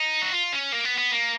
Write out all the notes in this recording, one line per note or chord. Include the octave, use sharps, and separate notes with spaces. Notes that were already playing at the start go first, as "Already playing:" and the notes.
Already playing: D#4
F#4
F4
C#4
A#3
B3
B3
A#3